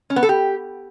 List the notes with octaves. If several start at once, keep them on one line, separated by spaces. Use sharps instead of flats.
C#4
B3
A4
G4